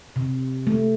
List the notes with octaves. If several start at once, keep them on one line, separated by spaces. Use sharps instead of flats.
C3
A3